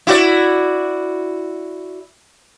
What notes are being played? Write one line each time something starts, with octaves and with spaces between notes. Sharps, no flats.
E4 F#4 D5